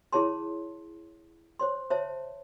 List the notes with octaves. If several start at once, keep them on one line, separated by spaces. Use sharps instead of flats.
E4 G#4 C#5 A5 C6
C5 C#5 C6
C5 C#5 E5 A5